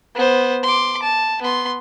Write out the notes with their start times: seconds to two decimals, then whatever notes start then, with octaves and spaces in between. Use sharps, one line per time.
0.15 B3 C5
0.63 C6 D6
1.03 A5
1.42 B3 C6